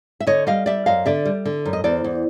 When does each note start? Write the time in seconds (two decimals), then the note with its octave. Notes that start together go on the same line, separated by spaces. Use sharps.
0.20 E5
0.27 D3 C#5 D#5
0.47 G3 D#5 F5
0.66 G3 D5 E5
0.86 F#2 D#5 F5
1.06 D3 D5 E5
1.25 G3
1.45 D3
1.65 F#2
1.73 D#5
1.84 E2 C5 D5
2.04 E2